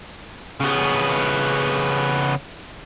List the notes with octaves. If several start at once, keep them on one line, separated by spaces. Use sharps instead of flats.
C#3 B3